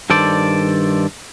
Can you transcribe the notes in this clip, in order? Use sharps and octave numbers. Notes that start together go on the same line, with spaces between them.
G2 D#3 A4 C5 D5